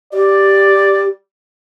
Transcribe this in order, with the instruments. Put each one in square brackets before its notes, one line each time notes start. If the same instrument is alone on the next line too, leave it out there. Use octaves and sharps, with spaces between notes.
[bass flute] G4 [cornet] D5